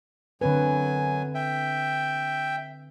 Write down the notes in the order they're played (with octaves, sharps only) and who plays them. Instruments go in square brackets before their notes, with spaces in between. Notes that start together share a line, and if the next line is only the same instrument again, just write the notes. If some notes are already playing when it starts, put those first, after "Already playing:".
[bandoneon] F#2 F#3 G#5 [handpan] D3 C4 B4
[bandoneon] E5 G5